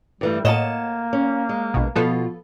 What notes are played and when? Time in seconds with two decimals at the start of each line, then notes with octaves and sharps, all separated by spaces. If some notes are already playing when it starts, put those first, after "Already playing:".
0.21 G2 E3 G3 A3
0.45 A2 A#3 C#5 D#5 F#5 A5 E7
1.13 C#4
1.49 G#3
1.74 A#1 B2
1.96 B2 F3 B3 F4 A4